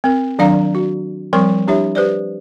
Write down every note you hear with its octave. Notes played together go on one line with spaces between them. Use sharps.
C4 A#4
D#3 F#3 D4 D5 F5 A#5
F#4
F3 G3 C4 A#4 C#6
D4 E4 G4 C#5 E5
G4 B4 C5 D5